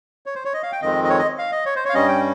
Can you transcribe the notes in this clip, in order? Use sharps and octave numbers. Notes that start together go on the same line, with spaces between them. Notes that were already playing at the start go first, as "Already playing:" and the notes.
C#5
C5
C#5
D#5
F5
G5
F2 D#3 G#3 C4 D#5
D#5
C#5
D#5
F5
D#5
C#5
C5
C#5
F5
G2 G3 C#4 D#5
G5